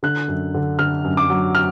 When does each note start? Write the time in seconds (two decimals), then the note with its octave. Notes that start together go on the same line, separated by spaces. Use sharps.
0.03 D3 F#6
0.28 F#2
0.54 D3
0.79 D3 F6
1.05 F#2
1.17 D6
1.30 F#3
1.55 F6